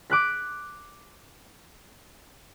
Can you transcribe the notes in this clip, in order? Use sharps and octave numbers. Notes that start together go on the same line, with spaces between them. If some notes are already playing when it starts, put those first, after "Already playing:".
D6 F#6 B6